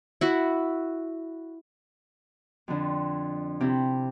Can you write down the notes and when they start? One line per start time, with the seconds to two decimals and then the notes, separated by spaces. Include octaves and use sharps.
0.21 E4 F#4
2.68 F2 D3
3.61 C3 E4